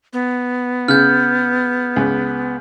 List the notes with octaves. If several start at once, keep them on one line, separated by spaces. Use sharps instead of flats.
B3
C#3 F6 G6
C#2